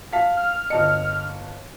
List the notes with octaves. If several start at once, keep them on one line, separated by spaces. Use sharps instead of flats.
F5 A5 B6
F6
G1 D#5 A5 C#7